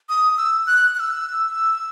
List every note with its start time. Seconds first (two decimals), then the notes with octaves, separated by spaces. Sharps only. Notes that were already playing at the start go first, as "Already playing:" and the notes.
0.09 D#6
0.38 E6
0.67 F#6
0.95 F#6
0.99 E6